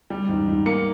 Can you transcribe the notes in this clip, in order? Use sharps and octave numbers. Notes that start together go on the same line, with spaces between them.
G3
G#2
G#2
A#3 C#7